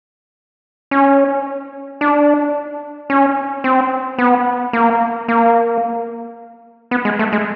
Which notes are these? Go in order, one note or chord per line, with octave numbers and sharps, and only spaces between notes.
C#4
D4
C#4
C4
B3
A#3
A#3
B3
G#3
A3
G#3